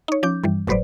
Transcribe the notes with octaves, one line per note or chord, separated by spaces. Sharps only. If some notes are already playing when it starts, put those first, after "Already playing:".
D#4 C#5
F3 C#4 D6 G6
G2 E3 G3
G1 A2 F#3 B4 C5 D5